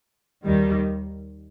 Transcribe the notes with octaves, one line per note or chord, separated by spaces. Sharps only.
D#2 D#3 G3